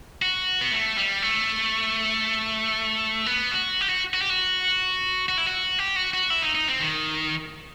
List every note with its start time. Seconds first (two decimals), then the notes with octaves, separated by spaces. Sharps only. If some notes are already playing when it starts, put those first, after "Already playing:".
0.22 F#4
0.61 B3
0.72 A3
0.98 G3
1.22 A3
3.26 B3
3.51 F#4
3.81 G4
3.89 F#4
4.14 F#4
4.21 G4
4.30 F#4
5.28 F#4
5.38 E4
5.47 F#4
5.79 G4
5.96 F#4
6.13 F#4
6.30 E4
6.42 D#4
6.55 D#4
6.68 C4
6.81 D#3